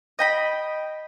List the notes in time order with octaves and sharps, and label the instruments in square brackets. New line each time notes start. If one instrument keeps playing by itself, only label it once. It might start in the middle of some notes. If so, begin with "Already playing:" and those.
[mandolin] D#5 G5 B5